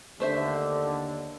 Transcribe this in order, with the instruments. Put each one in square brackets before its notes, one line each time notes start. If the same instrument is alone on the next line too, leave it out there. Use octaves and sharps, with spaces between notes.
[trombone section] D#2 D3 [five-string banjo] A3 C5 E5